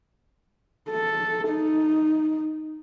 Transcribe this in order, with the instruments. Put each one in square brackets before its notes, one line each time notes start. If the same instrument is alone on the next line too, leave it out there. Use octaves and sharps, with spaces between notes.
[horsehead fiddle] A4
D#4